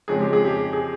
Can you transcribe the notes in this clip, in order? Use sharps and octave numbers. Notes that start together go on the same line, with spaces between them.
F2 C#3 G#3 G#4
G4
G#4
G4
G#4